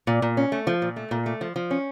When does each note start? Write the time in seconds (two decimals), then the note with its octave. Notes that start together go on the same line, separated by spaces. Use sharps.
0.07 A#2
0.22 A#2
0.37 C#4
0.52 A3
0.67 F3
0.82 A#2
0.96 A3
1.11 A#2
1.26 A3
1.41 F3
1.56 F3
1.71 C#4